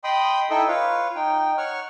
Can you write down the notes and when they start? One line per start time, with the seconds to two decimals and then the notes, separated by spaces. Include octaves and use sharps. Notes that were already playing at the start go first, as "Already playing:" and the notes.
0.04 D#5 G5 B5 C6 D#6
0.50 D#4 E4 A4 D#5 E5 G5
0.68 F4 B4 C#5 F5
1.15 D#4 G5
1.58 C#5 F#5 C#6 F6